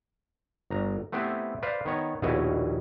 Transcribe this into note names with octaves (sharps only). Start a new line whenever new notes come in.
G1 A#5
A3 B3 C4 E4 G4 B4
B4 C5 D5 F5
D#3 B3 C#5 A#5
A#1 D#2 B2 E4 C#5 D#5